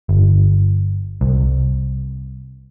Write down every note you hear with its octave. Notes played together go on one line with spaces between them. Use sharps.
G1
C2